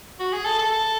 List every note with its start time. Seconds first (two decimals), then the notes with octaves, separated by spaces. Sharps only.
0.20 F#4
0.33 G#4
0.46 A4
0.59 A4
0.72 A4